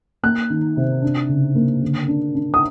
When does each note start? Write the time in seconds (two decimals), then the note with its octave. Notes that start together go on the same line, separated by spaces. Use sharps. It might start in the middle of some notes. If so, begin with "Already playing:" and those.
0.23 A#3 F#6
0.50 D#3
0.77 C3
1.02 D4
1.29 C#3
1.55 A#3
1.82 D3
2.08 D4
2.35 D4
2.54 D#6